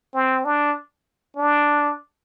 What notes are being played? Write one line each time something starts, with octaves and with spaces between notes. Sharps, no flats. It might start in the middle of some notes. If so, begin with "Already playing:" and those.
C4
D4
D4